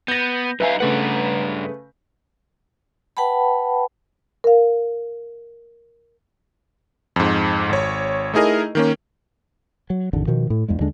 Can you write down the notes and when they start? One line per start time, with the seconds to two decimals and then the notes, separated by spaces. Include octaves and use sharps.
0.08 B3 G6 A#6
0.60 F#2 D#4 B4 E5 F5 G#5
0.80 G2 C#3 A3 D4 B4 F#5
3.17 B4 F#5 G5 A5 B5
4.44 A#4 F5
7.16 F2 G#2
7.69 G#1 C#5
8.34 A3 D#4 E4 G#4 A#4 D#5
8.75 D#3 A#3 C#4
9.90 F#3
10.13 G#1 E2 D3
10.27 B2 D#3 F3
10.50 A2
10.68 E2 G2 G#3
10.80 D#2 D3 G#3 D4